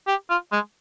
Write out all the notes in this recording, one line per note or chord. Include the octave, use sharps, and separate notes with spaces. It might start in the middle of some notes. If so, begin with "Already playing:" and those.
G4
F4
G#3